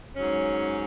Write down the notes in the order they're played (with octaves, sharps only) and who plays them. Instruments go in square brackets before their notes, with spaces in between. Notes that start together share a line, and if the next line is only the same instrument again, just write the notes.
[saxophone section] G#2 F#3 C#4